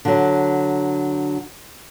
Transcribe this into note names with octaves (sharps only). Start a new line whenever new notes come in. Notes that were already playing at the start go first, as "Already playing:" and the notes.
D3 F#3